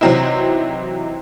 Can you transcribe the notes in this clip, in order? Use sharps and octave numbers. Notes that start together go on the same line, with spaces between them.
C3 E3 F#3 C4 D#4 E4